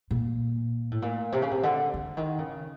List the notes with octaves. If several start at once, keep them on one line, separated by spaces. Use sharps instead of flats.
A#2
A2
A#2
C3
C#3
C3
D3
D3
D#3
C#3